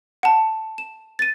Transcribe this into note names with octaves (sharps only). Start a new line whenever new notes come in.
F#5 A5
E7
A6 D#7